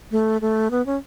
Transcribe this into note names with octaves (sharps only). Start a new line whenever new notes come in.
A3
A3
B3
C#4